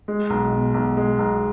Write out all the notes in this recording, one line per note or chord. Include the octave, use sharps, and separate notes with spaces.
G#3
B1
B2
B1
G#3
B1